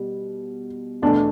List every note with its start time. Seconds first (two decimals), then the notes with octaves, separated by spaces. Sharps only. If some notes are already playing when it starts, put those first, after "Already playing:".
Already playing: B2 G3
1.02 E2 B2 A3 D4